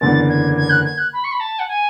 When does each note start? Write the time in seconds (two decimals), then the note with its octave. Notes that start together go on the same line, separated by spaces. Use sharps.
0.01 F#1 E2 D3 A6
0.29 G#6
0.57 G#6
0.70 F#6
0.85 G#6
0.98 F#6
1.13 B5
1.24 C#6
1.32 B5
1.40 A5
1.59 F#5
1.68 G#5